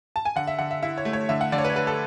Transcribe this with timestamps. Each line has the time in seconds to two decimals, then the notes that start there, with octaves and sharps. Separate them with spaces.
0.16 A5
0.25 G#5
0.36 D3 F#5
0.47 E5
0.59 D3 F#5
0.71 E5
0.82 E4 E5
0.98 C#5
1.05 A3
1.13 C#5
1.29 D3 E5
1.41 F#5
1.52 D3 D5
1.58 C#5
1.64 B4
1.70 C#5
1.76 D4 B4
1.87 A4